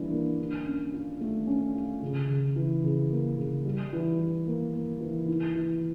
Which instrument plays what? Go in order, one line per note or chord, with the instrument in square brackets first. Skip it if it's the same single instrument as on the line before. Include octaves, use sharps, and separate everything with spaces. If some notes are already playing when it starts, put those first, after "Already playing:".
Already playing: [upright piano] E3 G3 A#3 D4
A#3
D3
C#4
F4
A3
C#4
F4
C#3
C#3
E3
C#3
A#3
C#3
G3
E3
E3
A#3
A#3
E3
E4
E3